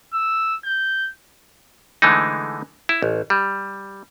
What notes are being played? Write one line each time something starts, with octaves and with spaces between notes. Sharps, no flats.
E6
G6
D3 E3 G#3 A3 D#4
E4
A1
G3